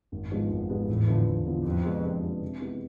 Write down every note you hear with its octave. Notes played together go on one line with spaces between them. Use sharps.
G#1
G#2 F3 G#3 B3
G#1
G#2 F3 G#3 B3
E2 A2
D3 F3 B3 E4
E2
D3 F3 B3 E4
F2 C3
G#3 B3 D4
C3
G#3 B3 D4
C3
G#3 B3 E4